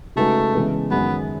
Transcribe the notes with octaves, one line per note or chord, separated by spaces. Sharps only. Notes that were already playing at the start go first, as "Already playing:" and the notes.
C#3 G#3 A3 D#4 F#4 B4
C#3 E3 G#3 B3
F#2 D#3 G#3 B3 C#4